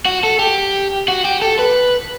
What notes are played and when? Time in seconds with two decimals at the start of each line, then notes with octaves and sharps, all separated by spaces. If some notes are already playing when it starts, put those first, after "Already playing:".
0.05 F#4
0.23 A4
0.39 G4
1.08 F#4
1.25 G4
1.42 A4
1.59 B4